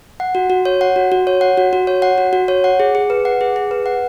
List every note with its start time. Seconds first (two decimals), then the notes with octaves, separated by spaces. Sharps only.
0.20 F#5
0.35 F#4
0.50 F#4
0.65 C#5
0.81 F#5
0.96 F#4
1.12 F#4
1.27 C#5
1.41 F#5
1.58 F#4
1.73 F#4
1.87 C#5
2.02 F#5
2.18 F#4
2.33 F#4
2.48 C#5
2.64 F#5
2.80 G#4
2.95 G#4
3.10 B4
3.25 F#5
3.41 G#4
3.56 G#4
3.71 B4
3.86 F#5